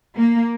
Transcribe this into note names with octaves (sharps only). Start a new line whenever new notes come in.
A#3